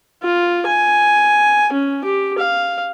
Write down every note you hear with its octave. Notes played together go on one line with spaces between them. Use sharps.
F4
G#5
C#4
G4
F5